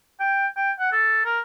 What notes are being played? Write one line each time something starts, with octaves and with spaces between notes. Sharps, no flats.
G5
G5
F#5
A4
A#4